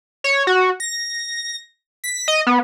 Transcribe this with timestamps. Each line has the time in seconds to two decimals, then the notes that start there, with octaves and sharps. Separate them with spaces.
0.24 C#5
0.47 F#4
0.80 A#6
2.04 B6
2.28 D#5
2.47 B3